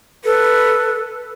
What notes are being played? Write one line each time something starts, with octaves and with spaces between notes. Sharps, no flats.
A4 B4